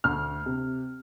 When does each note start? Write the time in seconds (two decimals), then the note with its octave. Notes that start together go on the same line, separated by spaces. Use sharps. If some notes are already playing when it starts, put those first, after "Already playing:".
0.04 D2 F6
0.46 C3